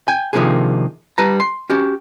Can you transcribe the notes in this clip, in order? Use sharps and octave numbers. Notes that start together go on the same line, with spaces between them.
G5 G#5
C3 D#3 F3 A#3 D4 G#4
G3 B4 A5 A#5
C6
C#4 F#4 G4